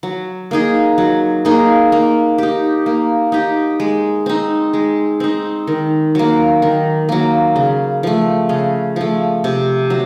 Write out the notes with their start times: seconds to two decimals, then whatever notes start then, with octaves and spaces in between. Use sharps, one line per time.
0.03 F#3
0.51 A#3 D#4 G#4
0.98 F#3
1.45 A#3 D#4 G#4
1.92 A#3
2.38 D#4 G4
2.86 A#3
3.32 D#4 G4
3.80 G#3
4.26 C4 D#4
4.73 G#3
5.20 C4 D#4
5.67 D#3
6.15 F#3 A#3
6.62 D#3
7.09 F#3 A#3
7.56 C#3
8.03 F3 A3
8.49 C#3
8.96 F3 A3
9.44 C3
9.90 F#3